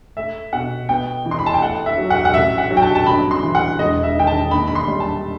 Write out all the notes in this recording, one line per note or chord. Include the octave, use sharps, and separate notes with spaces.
A3 E5
B2 F#5
B3 G5
E3
C6
B5
A5
G5
A3 F#5
E5
F#3
F#5
F#5
A1 E5
F#5
F#3
G5
A5
A5
G1 B5
C6
E3
F#5
E1 D#5
E5
D#3 G5
A5
D#2 B5
B5
C6
G3
A5